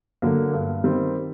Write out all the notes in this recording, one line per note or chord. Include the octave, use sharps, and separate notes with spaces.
D3 F#3 A#3
G2
D#3 G3 C4